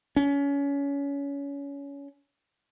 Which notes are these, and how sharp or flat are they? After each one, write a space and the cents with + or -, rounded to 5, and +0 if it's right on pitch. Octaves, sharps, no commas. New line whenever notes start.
C#4 +25